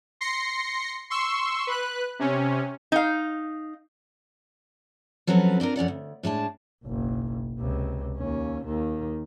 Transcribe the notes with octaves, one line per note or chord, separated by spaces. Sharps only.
C6 A#6 C7 C#7
C6 C#6 E6
B4 F#6
C3 C#4
D#4 F5
F3 F#3 C4 C#4 A4 B4
C4 D4 F4 A#4
F2 C#4 D5 F#5
D2
A2 G#3 D4 A5
F#1 B1
C#2 C3
D#2 C#4
D#2 D#3